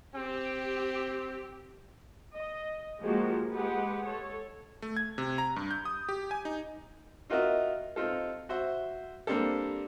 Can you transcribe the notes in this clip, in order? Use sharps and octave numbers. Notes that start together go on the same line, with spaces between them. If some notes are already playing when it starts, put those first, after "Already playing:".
C4 G4
D#5
F3 G#3 A#3 F#4 G4
G#3 G4 B4 F#5
A4 C#5
A3
G#6
C3
A#5
G2
G6
D#6
G4
G#5
D#4
D#4 F4 F#4 A#4 D#5 E5
C4 D#4 F4 A4
F#4 C5 E5
G3 A#3 C4 D4 G4 A4